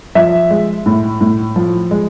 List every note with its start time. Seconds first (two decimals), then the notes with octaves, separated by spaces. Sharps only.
0.15 F3 E5
0.50 G#3
0.86 A2
1.21 A2
1.56 F3
1.91 G#3